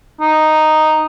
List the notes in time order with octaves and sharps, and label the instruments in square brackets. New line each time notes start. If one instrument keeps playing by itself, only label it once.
[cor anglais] D#4